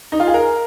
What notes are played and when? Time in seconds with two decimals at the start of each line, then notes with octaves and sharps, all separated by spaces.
0.12 D#4
0.20 F4
0.27 G#4
0.34 A#4